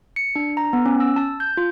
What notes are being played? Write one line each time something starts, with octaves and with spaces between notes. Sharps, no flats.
C#7
D4
A#5
B3
C#4
E6
A5
G6
F4